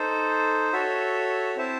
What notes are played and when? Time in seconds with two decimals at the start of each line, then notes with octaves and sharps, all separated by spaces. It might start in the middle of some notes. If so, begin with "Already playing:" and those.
Already playing: D#4 A4 C5
0.73 F#4 A4 C#5 E5
1.56 C4 E4 C5 E5 A5